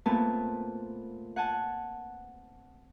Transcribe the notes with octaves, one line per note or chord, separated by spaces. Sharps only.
A#2 A3 B3 C4 G#5 A5
F#5 G#5 A5